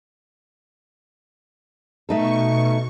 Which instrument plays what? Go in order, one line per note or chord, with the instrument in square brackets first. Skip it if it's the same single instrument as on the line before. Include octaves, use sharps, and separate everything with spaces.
[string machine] B2 C#6 [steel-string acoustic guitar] A3 D#4 A4